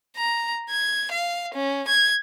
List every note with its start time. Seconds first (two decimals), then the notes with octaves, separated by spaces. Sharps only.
0.16 A#5
0.70 G#6
1.11 F5
1.54 C#4
1.88 G#6